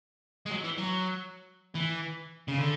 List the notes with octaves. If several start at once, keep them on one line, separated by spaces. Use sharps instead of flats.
G#3
F#3
E3
F#3
E3
C#3
D3